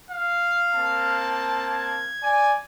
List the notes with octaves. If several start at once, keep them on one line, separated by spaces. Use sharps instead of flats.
F5
A#3 C4 A5
G#6
D5 G#5